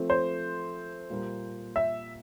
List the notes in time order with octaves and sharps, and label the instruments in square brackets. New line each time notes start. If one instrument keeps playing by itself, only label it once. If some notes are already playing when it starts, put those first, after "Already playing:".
Already playing: [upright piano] F3 A3 C4
[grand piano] C5
[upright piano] A#2 G3 A#3
[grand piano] E5